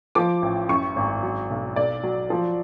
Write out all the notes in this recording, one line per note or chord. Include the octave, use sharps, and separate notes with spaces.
F3 D6
A1
F#2 C#6
G#1
F#3
B1
B1 D5
F#3
F3